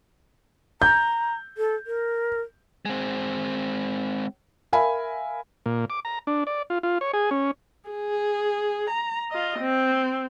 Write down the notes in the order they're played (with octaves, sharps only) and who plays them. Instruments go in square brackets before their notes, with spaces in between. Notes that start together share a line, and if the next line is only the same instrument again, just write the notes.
[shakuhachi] A#5 [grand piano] G6
[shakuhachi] A4
A#4
[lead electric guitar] G#3 C4
[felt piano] A#4 E5 F5 G#5 B5
[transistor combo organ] A#2
D6
A#5
D4
D5
F4
F4
C#5
G#4
C#4
[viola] G#4
A#5
F4 D#5
C4